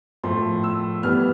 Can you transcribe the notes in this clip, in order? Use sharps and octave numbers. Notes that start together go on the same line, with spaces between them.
A2 F3 A3 C6
E6
E3 G3 B3 F6